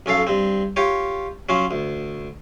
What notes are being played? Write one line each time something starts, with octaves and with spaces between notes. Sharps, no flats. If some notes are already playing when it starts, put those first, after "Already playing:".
B1 C#4 A4 F5
G2 C4
F4 G4 C#5
F#3 C#4 F4
D2